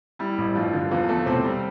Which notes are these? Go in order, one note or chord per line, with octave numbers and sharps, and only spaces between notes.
G3 E4
A1
G2 F3 F4
D3
E2 F3 F4
E2 A3 A4
C3 C4 C5
G3